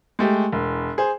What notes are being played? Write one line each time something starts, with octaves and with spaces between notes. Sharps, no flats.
G#3 A3 G4
E1
G#4 C5